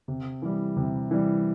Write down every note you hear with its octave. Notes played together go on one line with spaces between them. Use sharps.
C3
E3 G3
C3
E3 G3